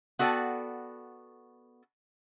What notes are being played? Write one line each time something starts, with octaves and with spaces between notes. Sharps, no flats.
B3 F#4 A4 D5 G5